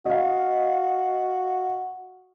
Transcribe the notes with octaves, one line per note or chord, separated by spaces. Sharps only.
F#4 D#5 F5